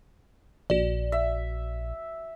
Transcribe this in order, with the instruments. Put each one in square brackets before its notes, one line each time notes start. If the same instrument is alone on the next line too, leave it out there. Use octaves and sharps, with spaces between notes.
[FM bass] A#1 [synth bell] F#4 D5
[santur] E5